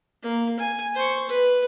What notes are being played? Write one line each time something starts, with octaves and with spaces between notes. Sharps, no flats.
A#3
G#5
C5 C#6
B4